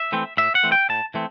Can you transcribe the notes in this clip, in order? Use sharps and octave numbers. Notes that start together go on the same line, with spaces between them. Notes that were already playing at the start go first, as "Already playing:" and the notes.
Already playing: E5
E3 A3 C4
A2 E5
F#5
E3 A3 C4
G5
A2 A5
E3 A3 C4